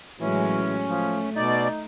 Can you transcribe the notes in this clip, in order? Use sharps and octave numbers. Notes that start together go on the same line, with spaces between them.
A2 E3 F#3 G#3 C#4
F3 A3
B2 D#4 D5